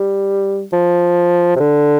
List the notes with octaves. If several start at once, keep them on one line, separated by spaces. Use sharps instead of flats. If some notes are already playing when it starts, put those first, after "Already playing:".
Already playing: G3
F3
C3
D3